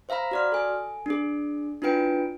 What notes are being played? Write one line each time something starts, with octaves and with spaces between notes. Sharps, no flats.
C5 E5 F5 A#5 B5
F#4 D5 F6
A4 G#5
D4 G#4
D4 E4 F4 B4 G5 D7